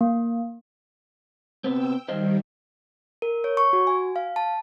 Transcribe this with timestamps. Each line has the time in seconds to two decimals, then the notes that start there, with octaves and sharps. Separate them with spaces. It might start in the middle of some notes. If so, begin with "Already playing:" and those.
0.01 A#3
1.64 C3 B3 C4 G5 E6
2.08 D#3 G3 C5 D#5 F5
3.22 A#4
3.44 C#5
3.57 C#6
3.73 F#4
3.87 G#5
4.16 F5
4.36 A5